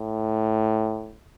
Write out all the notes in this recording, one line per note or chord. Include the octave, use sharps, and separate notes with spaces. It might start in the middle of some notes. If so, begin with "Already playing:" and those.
Already playing: A2